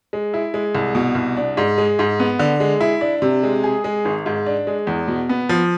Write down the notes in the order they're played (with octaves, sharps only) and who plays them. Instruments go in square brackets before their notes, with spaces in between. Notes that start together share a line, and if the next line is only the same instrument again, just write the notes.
[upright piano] G#3
E4
G#3
C2
B2
C2
D4
G#2
G#3
G#2
B3
D3
G#3
E4
D4
C3
G#3
G#4
G#3
G#1
G#2
D4
G#3
E2
B2
B3
F3